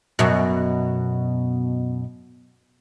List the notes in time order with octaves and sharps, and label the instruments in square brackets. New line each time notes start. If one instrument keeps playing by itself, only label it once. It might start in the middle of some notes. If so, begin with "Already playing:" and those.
[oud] F#2 B2